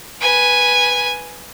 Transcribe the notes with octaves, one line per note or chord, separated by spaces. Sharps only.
B4 G#5